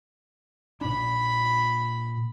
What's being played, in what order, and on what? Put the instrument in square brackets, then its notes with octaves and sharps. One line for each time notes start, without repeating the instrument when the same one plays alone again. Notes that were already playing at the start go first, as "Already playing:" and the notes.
[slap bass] A#2 D4 [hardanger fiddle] B5